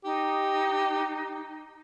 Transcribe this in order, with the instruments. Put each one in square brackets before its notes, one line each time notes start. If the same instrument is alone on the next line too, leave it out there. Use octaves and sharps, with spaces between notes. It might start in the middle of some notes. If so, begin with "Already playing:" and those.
[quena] D#4 [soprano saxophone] G4